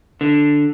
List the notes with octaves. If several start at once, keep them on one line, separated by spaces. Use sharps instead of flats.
D3